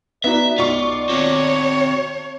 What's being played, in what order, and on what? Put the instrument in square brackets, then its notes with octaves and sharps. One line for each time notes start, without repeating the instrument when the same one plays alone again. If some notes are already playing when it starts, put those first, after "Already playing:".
[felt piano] B3 D#4 F#4 [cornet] D5 [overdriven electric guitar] E5
[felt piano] B1 C#6 [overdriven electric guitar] F4
[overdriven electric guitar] C4 F#4 [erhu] C#5